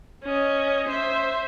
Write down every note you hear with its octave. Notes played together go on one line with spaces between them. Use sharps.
C#4 D#5
C5 E5